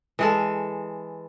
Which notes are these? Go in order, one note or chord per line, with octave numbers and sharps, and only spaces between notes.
E3 G#3 A4